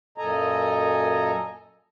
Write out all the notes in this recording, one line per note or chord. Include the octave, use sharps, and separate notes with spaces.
F#2 A#2 A4 D#5 G#5 A#5